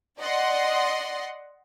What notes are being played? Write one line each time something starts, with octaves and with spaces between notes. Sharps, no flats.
D5 D#5 F#5 C6